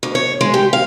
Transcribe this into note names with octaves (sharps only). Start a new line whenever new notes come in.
D2
C#5
G#3
G4
F5